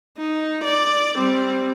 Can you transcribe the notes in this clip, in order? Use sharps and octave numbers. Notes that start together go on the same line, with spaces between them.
D#4
D5
G3 C4